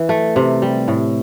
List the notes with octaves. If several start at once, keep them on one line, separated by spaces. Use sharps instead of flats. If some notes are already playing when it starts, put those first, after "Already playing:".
Already playing: E3
A3
C3
G3
A2